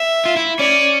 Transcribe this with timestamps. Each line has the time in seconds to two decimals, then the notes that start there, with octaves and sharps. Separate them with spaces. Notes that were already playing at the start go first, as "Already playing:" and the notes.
Already playing: E5
0.25 F4
0.36 E4
0.59 C#4 D5